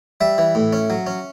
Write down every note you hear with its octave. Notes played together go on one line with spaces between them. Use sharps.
G3 E5
E3
A2
C#4
F#3
C#4